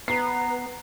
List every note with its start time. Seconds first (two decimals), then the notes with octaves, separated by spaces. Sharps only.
0.08 B3 B4 A#5 C7